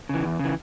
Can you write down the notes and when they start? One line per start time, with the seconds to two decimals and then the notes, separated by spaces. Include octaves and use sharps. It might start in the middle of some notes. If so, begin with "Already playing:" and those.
0.09 C#3 E3
0.24 E2
0.39 C#3 E3